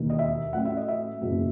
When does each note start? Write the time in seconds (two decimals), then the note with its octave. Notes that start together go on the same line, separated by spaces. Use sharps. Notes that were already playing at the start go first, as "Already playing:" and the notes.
Already playing: E1 D#2 D#3
0.10 D#5
0.19 E5
0.53 A1 A2 F#3 F#5
0.65 E5
0.77 D#5
0.88 E5
1.21 F#1 E2 B2 F#3 B3